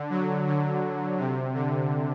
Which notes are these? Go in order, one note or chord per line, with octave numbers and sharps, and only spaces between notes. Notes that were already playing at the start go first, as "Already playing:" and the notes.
Already playing: D3
F#3
D3
C3
D3